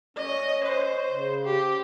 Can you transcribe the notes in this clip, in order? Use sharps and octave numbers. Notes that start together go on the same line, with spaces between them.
C#4 D#5
C5
C#3
G4